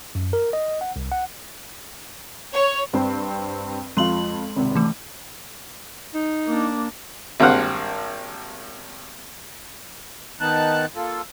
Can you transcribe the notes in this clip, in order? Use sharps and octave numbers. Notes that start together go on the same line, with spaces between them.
F#2
A#4
D#5
F#5
C2
F#5
C#5
G2 C4
F2 G#3 F4 C6 F#7
G#1 C#2 C3
E3 A3
D#4
A#3 D4
G#1 G2 A#3 C5 F5 F#5
D#3 B3 D#4 A5 F#6
A#3 F4 A4